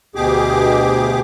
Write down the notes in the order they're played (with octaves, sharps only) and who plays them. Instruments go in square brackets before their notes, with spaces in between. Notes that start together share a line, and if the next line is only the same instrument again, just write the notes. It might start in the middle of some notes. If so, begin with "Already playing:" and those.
[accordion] D2 B2 G4 G#4 D6